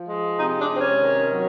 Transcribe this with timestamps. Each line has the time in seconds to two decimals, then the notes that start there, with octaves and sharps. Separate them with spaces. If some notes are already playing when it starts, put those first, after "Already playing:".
Already playing: F3
0.08 G#3
0.39 C3 D#4
0.60 D4
0.70 C3
0.75 C4
0.80 C#4
1.02 D#3
1.33 F#3